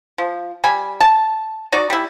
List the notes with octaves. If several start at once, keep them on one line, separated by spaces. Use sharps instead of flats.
F3
G3 G#5 B5
A5
D#4 F#4 D5
G3 E4